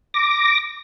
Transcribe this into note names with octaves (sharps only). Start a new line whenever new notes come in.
D6 A#6